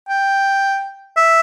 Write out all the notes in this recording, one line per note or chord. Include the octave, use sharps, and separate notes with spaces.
G5
E5